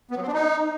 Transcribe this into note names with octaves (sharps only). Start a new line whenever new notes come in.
B3
F#3
C4
D4
D#4